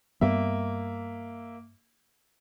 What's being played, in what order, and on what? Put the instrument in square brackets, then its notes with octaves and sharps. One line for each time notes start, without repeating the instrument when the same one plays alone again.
[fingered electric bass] G2 G3 B3 [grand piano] A#3 E5